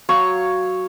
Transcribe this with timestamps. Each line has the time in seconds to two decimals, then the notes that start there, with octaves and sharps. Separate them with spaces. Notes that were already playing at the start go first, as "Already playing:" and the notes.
0.09 F#3 C#5 F5 C#6